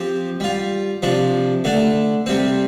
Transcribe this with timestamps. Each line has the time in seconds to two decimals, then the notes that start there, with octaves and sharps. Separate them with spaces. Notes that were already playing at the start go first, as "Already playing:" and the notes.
Already playing: F3 C4 G4
0.40 G3 F4
1.02 C3 F3 D4
1.64 D3 A3 D4
2.26 C3 G3 C4